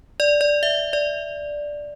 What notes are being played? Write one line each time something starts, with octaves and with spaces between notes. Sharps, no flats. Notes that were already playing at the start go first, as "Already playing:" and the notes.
D5
D5
E5
D5